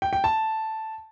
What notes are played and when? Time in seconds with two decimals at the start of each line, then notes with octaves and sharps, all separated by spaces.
0.02 G5
0.13 G5
0.24 A5